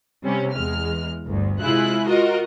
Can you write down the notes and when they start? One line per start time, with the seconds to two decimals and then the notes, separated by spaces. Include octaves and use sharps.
0.24 C3 G3 C4 C#4
0.54 E2 G#3 F6
1.26 G1 D2
1.61 C3 G#3 E4 F4 G#4 F#6
2.08 F4 F#4 A#4 D#5